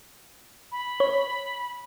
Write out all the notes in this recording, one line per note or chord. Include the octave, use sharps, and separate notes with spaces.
B5
C#5